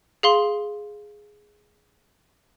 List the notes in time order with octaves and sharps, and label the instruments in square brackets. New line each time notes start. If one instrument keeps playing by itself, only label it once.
[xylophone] G#4 F5 C6